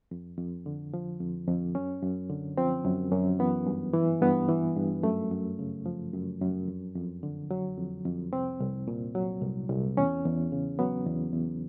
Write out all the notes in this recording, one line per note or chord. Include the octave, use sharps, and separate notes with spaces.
F2
F2
D3
F3
F2
F2
F#2 C#4
F#2
D3
F3 C4
F#2
F#2
E3 B3
G2
E3
G2 B3
E3
G2
F#2 A3
F#2
C#3
F3
F#2
F#2
F2
F2
D3
F#3
F2
F2
C2 C4
C2
A#2
F#3
C2
C2
E2 C#4
E2
C#3
F#3 B3
E2
E2